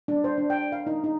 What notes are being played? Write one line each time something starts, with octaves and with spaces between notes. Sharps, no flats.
D4
C5
D4
G5
F5
D#4
D#4